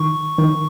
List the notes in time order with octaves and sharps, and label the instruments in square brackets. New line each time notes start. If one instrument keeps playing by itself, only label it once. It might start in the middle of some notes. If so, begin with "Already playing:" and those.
Already playing: [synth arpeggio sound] D#3 [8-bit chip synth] C#6
[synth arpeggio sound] D#3